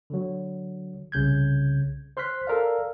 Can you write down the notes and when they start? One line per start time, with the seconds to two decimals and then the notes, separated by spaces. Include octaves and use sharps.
0.10 D3 F#3
1.12 C2 C#3 G6 G#6
2.17 C5 C6 F6 F#6 B6
2.47 A4 A#4 D5 F5